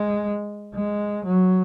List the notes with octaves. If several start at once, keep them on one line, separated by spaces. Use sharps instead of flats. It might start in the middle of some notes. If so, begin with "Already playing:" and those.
Already playing: G#3
G#3
F#3